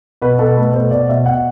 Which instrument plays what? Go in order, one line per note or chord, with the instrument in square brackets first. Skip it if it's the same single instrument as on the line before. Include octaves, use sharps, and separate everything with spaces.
[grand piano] B2 B4
B2 A4
A3 B4
B2 C5
B2 D5
B2 E5
B2 F#5